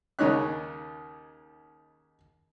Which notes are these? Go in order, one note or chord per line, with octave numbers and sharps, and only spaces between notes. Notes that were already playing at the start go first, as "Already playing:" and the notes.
D#2 C#3 D#4 C#5 F#6